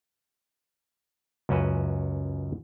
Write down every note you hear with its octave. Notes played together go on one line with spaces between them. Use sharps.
C#2 F#2 C#4 F#4 B4